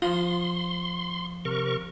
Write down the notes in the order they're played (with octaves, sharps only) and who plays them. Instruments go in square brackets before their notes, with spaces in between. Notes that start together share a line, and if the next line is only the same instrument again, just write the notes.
[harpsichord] F3 D#6 [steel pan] F4 [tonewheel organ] C6
[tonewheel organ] C3 A#4 C#6